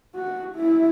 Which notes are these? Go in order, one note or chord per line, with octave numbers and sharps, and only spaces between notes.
F#4
E4